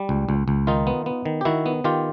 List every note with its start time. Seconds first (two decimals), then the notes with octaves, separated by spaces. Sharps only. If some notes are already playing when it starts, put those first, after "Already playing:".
Already playing: G3
0.09 C#2
0.29 C#2
0.48 C#2
0.67 D#3 D#4 F4
0.87 B3
1.06 B3
1.26 D#3
1.41 G4
1.45 D#3 E4 F#4
1.66 B3
1.84 D#3 F4 G4